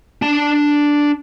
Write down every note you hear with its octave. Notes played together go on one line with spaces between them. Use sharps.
D4 A5